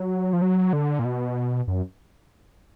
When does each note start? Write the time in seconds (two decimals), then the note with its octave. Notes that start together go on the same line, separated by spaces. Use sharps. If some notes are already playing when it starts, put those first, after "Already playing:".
Already playing: F#3
0.33 F3
0.42 F#3
0.73 D3
0.99 A#2
1.05 B2
1.68 F#2